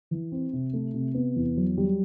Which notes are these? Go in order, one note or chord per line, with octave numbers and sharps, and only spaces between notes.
E3
C4
C3
A3
C3
B3
E2
F#3
G3